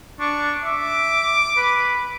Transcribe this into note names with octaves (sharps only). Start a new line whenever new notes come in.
D4 C#6
E5 D6
B4